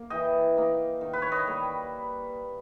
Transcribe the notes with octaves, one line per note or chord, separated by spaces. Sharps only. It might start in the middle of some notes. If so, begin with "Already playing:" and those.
Already playing: A#3
E3 D#5 G5
A#3 D#4
D#3
B4
C#5
B4 D#5
G3 A#3